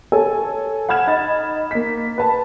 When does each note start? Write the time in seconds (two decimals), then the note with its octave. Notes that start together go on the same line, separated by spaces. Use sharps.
0.12 A4 C#5 G#5
0.89 F#5 B5 F6 G#6 E7
1.07 D#4 B5 A6
1.71 A#3 B6
2.18 B4 A5